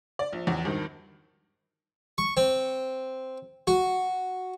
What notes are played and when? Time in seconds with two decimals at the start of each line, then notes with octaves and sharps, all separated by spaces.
0.19 D5
0.33 A#1
0.47 A1 E2
0.65 G#1 G2 D#3
2.18 C#6
2.37 C4
3.67 F#4